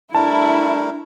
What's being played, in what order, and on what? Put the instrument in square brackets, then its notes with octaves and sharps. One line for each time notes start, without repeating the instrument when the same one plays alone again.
[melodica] G3 A3 A#4 [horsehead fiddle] D4 [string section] E4 [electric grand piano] A5